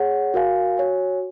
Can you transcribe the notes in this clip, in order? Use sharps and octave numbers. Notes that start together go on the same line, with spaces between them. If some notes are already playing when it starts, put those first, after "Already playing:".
Already playing: G#4 C#5 F#5
F#4 A#4 F5 G#5
F#4 C#5 G#5